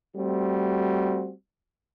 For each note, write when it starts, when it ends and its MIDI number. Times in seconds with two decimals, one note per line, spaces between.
0.16 1.33 55
0.16 1.33 57
0.16 1.33 60
0.16 1.33 66